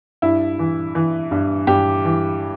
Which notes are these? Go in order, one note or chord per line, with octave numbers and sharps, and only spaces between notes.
G2 E4
E3
E3
G2
G2 G4
E3